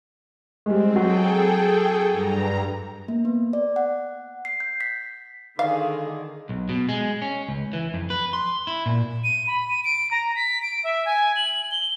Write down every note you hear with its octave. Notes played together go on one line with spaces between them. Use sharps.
G3 G#3 C4
F#3 G#4 A4 G5
G2 A#5
A#3
B3
D5
F#5
C7
G6
B6
D3 D#3 G#4 F5
B1
B2
G#3
C#4
C#2
E3
F2
B4
C6
E4
A#2
D#7
B5
D#7
D7
A#5
B6
D7
E5
G#5
F#7
G7